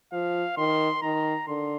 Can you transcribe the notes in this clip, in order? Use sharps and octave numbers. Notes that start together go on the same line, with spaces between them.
F3 F5
D#3 C6
D#3 A#5
D3 C6